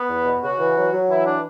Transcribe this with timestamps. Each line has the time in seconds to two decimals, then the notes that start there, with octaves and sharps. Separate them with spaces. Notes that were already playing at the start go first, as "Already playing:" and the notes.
Already playing: B3
0.08 E2
0.25 B2
0.42 C#3 F#4
0.59 E3
0.76 F#3
0.92 F#3
1.09 E3 E4
1.25 D4